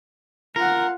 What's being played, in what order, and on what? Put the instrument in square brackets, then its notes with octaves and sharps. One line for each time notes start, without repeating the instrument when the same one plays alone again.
[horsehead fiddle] F4 F#5 [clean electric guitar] A#4